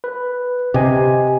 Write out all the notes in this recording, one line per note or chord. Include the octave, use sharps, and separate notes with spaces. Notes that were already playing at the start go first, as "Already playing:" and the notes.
B4
C3 G4 D#5 G#5